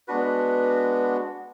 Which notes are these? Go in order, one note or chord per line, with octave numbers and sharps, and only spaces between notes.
G#3 B3 D4 F#4 B4